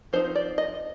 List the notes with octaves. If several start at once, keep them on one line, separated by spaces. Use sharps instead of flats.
F3 C4 D#4 C5
D5
D#5